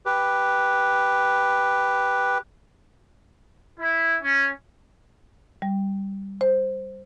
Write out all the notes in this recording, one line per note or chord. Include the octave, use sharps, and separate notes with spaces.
G4 B4
E4
C#4
G3
C5